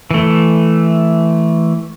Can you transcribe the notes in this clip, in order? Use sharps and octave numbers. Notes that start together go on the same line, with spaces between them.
E3 A3